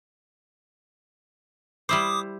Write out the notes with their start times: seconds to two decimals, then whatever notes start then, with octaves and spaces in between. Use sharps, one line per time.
1.89 G3 E4 C5 D6 D#6